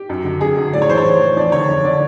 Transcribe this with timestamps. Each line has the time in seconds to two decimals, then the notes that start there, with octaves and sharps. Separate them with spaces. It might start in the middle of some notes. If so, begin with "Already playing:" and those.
Already playing: G4
0.09 F#2
0.24 D3
0.40 F#2 G#4
0.57 D3
0.73 A2 D5
0.82 C#5
0.89 E3 C5
0.98 C#5
1.05 A2
1.21 E3
1.37 F2 D5
1.52 D3 C#5
1.68 F2
1.84 D3 D5